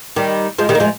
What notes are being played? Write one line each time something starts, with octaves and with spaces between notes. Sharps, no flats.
D#3 G3
F3 G#3
D#3 G3
A#3
F3 G#3